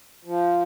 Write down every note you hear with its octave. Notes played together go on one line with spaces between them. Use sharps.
F3